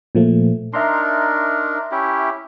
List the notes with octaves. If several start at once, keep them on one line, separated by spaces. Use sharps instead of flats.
A#2 F3 A3
D4 D#4 A#4 E5 A#5 C6
C#4 E4 G4